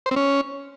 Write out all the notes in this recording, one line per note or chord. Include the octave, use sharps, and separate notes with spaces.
C5
C4
C#4